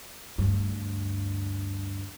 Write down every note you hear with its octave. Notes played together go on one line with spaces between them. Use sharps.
D2 G2